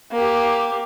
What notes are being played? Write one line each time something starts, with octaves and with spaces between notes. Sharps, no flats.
A#3 G4